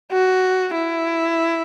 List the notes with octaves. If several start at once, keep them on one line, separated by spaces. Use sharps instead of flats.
F#4
E4